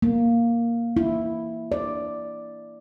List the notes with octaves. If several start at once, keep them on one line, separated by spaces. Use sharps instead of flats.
A#3
E4
D5